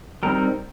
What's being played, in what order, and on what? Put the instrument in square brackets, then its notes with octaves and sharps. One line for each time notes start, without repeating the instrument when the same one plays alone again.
[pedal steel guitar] G3 C4 D#4 A#4